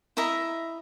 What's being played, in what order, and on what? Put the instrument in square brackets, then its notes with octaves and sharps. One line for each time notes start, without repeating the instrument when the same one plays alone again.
[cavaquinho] E4 D#5 E5 A#5